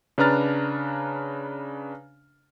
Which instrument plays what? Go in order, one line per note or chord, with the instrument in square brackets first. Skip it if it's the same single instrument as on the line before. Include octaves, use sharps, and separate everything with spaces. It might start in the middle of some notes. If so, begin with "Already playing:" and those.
[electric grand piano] C#3 D4 B4 A#5 F6 A6